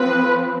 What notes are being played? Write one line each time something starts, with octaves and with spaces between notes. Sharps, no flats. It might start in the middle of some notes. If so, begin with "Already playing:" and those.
Already playing: F3 C4 B4